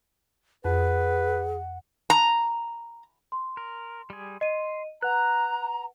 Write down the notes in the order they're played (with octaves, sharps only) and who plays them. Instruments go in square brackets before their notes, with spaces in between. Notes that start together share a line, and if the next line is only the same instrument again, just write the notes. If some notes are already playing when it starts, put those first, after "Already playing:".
[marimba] F2 [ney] G#4 [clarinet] B4 [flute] F#5
[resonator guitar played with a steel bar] A#5
[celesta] C6
[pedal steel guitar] A#4
G3 G#4
[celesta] D#5 D#7 [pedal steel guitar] C6
[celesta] B4 F#5 [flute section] A#5 [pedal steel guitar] F#6